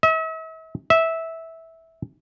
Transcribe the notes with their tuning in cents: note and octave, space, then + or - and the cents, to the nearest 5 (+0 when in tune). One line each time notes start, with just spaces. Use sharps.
E5 -40
E5 -10